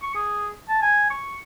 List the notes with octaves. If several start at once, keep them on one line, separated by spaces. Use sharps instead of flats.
C#6
G#4
A5
G#5
C#6